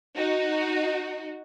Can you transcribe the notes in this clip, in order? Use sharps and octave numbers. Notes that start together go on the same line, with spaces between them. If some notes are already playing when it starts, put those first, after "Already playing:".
D#4 F#4